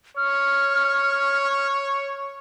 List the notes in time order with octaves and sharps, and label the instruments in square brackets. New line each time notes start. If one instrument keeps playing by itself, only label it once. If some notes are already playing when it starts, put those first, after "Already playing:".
[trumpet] C#5 [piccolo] F6